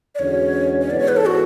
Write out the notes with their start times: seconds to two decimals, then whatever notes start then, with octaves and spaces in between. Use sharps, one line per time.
0.15 D5
0.19 E2 D3 G#3 C#4 F#4 C#5
0.81 C#5
0.90 G#2 E3 G#3 B3 D5
0.99 C#5
1.08 B4
1.17 A4
1.26 F#4